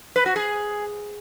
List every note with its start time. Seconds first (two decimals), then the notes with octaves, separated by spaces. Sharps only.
0.16 B4
0.26 F#4
0.36 G#4